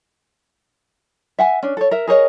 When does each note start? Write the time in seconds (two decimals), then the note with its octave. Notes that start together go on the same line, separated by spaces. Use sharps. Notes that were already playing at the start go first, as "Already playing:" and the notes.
1.39 E5 F#5 G#5
1.63 C#4 D4
1.77 A4 C#5
1.91 A#4 E5
2.07 G#4 A#4 C#5 D#5